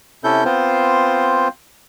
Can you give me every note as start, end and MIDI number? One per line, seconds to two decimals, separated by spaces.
0.24 0.44 48
0.24 0.44 61
0.24 0.44 64
0.24 0.44 69
0.24 0.44 91
0.45 1.48 59
0.45 1.48 60
0.45 1.48 65
0.45 1.48 72